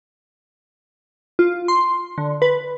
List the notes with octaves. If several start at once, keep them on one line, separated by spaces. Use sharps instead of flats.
F4
C6
D3
B4